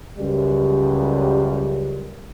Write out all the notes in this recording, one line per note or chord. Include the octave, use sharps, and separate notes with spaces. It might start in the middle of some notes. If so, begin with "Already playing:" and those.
C#2 F#2 G3